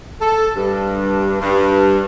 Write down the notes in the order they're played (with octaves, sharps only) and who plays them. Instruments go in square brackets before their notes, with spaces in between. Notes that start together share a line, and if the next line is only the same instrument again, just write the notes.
[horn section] A4
G2
G2